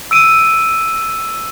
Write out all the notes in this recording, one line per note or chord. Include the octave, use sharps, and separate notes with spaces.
E6 D7 D#7